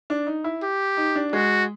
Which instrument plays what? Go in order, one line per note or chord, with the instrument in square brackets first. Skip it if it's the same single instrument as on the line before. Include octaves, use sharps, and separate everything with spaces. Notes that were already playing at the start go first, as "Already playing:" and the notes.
[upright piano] D4
D#4
E4
[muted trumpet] G4
[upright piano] D#4
D4
[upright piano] G#3 [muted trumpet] F#4